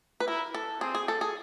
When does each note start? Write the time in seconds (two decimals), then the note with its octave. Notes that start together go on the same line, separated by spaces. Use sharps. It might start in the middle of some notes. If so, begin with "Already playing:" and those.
0.20 B4
0.27 E4 A#4
0.54 A4
0.81 C4 G#4
0.95 G#4
1.08 A4
1.21 G#4